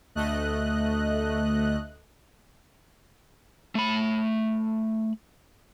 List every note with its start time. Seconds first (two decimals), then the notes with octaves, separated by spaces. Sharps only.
0.15 D2 A3 D#5 F#6
3.75 A3 B5